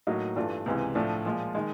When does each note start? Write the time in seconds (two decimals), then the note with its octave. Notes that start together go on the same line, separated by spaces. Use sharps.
0.07 A2 F#3 A#3 D#4 F#4
0.36 G2 E3 A3 D4 F4
0.66 C#2 C3 E3 G#3
0.95 A2 F3 A3 D4
1.25 A#2 F3 G#3
1.55 D#3 G#3